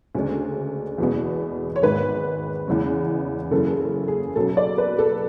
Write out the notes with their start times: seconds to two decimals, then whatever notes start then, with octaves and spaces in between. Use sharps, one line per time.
0.15 D2 C#3 G#3 D4
0.98 E2 B2 G#3 B3
1.76 C#5
1.83 G#1 G#2 G#3 B4
2.67 E2 C#3 E3 G#3 C#4
3.51 F#2 C#3 E3 A4
3.80 A4
4.08 G#4
4.36 B1 B2 F#3 C#4 A4
4.57 D5
4.78 B4
4.99 A4